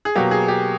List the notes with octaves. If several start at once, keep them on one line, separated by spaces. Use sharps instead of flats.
G#4
B2 F#3 A#3 G4
G#4
G4